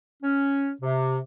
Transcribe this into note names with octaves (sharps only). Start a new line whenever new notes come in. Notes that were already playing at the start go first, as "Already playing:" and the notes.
C#4
C3